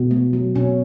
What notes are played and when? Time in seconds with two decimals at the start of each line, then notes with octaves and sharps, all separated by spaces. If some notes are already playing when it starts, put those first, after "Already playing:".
Already playing: B2
0.11 A3
0.33 F#3
0.55 B2 C#4